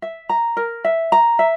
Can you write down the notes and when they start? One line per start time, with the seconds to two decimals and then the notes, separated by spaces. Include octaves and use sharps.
0.02 E5
0.29 A#5
0.57 A#4
0.85 E5
1.12 A#5
1.39 E5